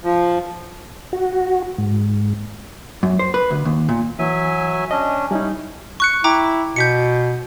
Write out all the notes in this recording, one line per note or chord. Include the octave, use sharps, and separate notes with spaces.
F3
F#4
G#2
F#2
C5
B4
D2
D#2
A#2
E3 F#3 E5 G#5
C#4 D4 D#5
G3 C#4 D#4 E4
C#6 F#6 C#7
E4 G5 A#5 D6
B2 G6 B6 C#7